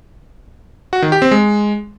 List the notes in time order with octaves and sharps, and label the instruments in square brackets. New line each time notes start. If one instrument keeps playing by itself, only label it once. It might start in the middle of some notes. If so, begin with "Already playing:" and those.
[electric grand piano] F#4
D#3
G4
C4
G#3